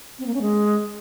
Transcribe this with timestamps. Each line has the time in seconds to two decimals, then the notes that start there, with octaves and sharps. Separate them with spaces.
0.19 C4
0.26 A#3
0.34 C#4
0.42 G#3